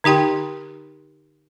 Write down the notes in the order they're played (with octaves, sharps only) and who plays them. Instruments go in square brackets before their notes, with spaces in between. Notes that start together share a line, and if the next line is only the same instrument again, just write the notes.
[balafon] D3 D#4 G4 G5 C6